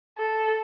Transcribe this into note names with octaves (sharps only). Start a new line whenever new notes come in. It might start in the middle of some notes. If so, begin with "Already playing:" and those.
A4